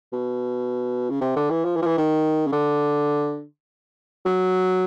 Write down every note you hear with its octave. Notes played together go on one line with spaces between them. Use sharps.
B2
C#3
C3
D3
E3
F3
E3
F3
E3
D#3
C#3
D3
F#3